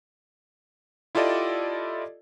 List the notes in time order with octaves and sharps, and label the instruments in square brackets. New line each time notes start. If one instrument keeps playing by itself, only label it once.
[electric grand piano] E4 F4 G4 A4 D5 D#5